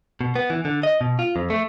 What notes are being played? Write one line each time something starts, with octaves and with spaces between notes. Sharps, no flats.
B2
B3
E3
D3
D#5
B2
F4
F2
A3